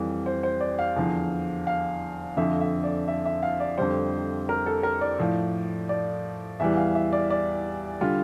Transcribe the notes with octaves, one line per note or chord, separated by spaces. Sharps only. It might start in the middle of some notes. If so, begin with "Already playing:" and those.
Already playing: F2 E3 G3
C5
C5
D5
F5
E2 D3 F3
F5
F2 D3 F3 E5
E5
D5
E5
E5
F5
D5
F2 D3 G3 C5
A#4
A4
A#4
D5
A2 F3
D5
E2 E3 G3 E5
F5
E5
D5
D5
D3 G3 F4